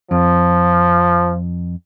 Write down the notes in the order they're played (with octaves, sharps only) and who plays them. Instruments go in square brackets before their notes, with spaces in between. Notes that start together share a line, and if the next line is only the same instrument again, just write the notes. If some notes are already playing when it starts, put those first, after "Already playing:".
[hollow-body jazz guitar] F2 [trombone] F3